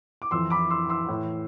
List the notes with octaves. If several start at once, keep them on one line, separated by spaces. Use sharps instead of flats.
D6
F2 E3 C6 E6
B5 D6
C6 E6
C6 E6
A2 E3